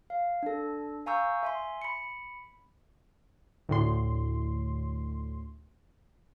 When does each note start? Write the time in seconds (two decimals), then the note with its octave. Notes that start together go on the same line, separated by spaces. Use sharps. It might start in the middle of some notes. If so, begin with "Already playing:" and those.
0.10 F5
0.43 D4 A4
1.06 F5 G#5 A#5 C#6 E6 G6
1.43 E5 G#5 C6
1.82 B5 C#7
3.69 D2 A2 C6